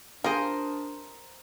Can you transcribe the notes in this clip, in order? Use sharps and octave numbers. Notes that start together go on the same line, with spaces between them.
D4 F4 G#4 A#4 C5 D#5 G#5